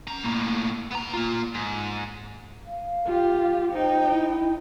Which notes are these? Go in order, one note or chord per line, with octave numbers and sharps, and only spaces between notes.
C#4 A#5
A2 A#3
B3 A#5
A#3 F4
G#2
F5
F4 G4
D#4 C5 G5
E4